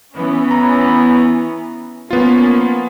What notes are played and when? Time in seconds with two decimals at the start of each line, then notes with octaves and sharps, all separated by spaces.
0.14 E3 B3 C#4
0.51 A#5
2.11 F3 A#3 B3 C#4 F4